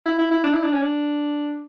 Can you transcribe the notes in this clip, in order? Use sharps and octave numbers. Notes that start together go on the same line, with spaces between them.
E4
E4
E4
D4
E4
D4
C#4
D4